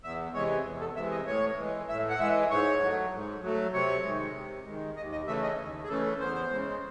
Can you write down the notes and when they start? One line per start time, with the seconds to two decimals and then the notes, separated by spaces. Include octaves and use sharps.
0.03 E2 E5
0.34 C3 E3 G#3 C#5
0.65 E2
0.81 A4
0.96 C3 E3 G#3 E5
1.11 D#5
1.27 A2 C#5
1.57 E3 G#3
1.89 A2 E5
2.10 F#5
2.19 E3 G#3 E5
2.50 G#2 C#5
2.81 F#3 A3
3.12 G#2
3.43 F#3 A3
3.73 C3 C#5
4.04 D#3 G#3
4.35 C3
4.66 D#3 G#3
4.97 D#2 D#5
5.12 D#5
5.27 C#3 E3 A3 E5
5.43 D#5
5.58 D#2
5.84 G#4
5.89 C#3 E3 A3 A4
6.20 E2 C5
6.51 C#3 G#3